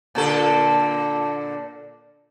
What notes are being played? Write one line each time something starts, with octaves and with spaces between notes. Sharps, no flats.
A#2 D3 A4